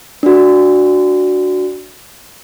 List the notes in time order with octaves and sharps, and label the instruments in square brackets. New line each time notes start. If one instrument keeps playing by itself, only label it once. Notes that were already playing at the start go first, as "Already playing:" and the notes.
[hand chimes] D4 F#4